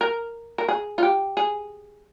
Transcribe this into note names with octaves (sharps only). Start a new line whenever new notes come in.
A#4
A#4
G#4
F4
G4
G#4